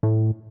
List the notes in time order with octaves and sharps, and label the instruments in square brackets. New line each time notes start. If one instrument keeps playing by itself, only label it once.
[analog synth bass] A2